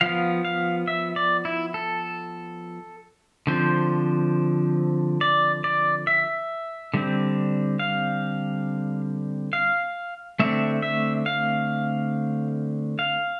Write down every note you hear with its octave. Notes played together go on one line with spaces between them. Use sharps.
F3 B3 F5
F5
E5
D5
E4
A4
D3 F3 C4 C5
D5
D5
E5
D3 G3 C4
F5
F5
D3 A3 C4 E5
E5
F5
F5